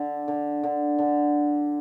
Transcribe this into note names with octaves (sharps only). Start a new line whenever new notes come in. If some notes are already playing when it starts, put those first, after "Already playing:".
Already playing: D3
D3
D3
D3